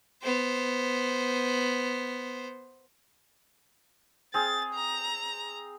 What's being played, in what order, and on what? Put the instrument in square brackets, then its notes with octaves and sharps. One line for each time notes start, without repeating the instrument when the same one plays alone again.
[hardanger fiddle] B3 C5
[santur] C4 G#4 F5 [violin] A6
[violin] A#5